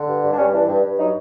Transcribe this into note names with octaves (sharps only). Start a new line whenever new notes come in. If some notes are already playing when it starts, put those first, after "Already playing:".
Already playing: D3
G2
G2
D4
G3 C#4
E3 D4
G2
G2
F#3 D#4